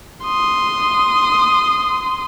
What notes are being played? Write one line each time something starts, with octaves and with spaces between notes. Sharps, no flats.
C6 D#6